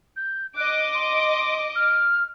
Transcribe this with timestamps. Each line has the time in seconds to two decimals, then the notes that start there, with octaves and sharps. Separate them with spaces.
0.16 G6
0.56 D#5 D6 F#6
0.94 C6
1.76 F6